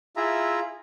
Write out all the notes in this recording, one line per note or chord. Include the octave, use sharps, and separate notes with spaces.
E4 F4 G#4 E5 A#5